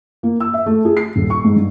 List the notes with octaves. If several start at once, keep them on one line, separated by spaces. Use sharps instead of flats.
A#3
E6
E5
A3
G#4
C7
D#1
C#6
G#2
G2